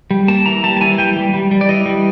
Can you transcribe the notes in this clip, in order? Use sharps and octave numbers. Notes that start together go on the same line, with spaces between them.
G3
A#3 A5
E3 A#5
G3 A5
A5
E3 G#5
G3 G5
G3
G3
G3
D5
E3 D#5
G3